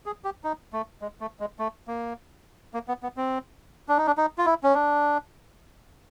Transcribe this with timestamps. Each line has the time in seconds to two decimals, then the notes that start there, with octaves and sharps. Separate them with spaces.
0.06 G#4
0.24 G4
0.44 D#4
0.73 A3
1.02 G#3
1.21 A3
1.40 G#3
1.59 A3
1.88 A#3
2.74 A#3
2.88 B3
3.03 B3
3.17 C4
3.89 D4
3.98 D#4
4.07 D4
4.18 D#4
4.38 F4
4.46 E4
4.63 C#4
4.75 D4